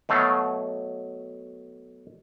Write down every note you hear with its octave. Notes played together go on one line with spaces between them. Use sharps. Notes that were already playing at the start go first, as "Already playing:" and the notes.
B2 F#3 A3 F5